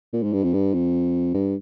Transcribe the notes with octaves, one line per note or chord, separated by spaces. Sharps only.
A#2
G#2
G2
F2
G2
F2
G2